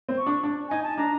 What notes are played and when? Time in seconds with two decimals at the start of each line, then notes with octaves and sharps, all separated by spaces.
0.09 C4
0.17 C#6
0.26 D4
0.43 D4
0.69 D#4 G#5
0.83 A5
0.97 D4 A#5